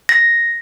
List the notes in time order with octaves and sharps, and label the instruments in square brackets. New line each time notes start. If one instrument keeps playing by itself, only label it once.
[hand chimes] A#6